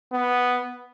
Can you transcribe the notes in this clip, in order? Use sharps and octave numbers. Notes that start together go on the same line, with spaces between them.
B3